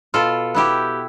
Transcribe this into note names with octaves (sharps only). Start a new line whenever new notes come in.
B2 F4 A4
B3 E4 G4